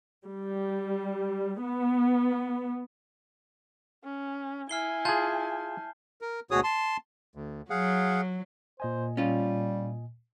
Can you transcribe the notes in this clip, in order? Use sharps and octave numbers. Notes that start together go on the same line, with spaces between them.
G3
B3
C#4
E4 G#5 F6 C7 G7
F4 G#4 A5 G6
A#4
D2 B2 F#4 G#4 C#5 D#6
A5 C6
D2
F#3 G#4 F5 F#5
A#2 C5 D#5 G#5
G3 C#4 F4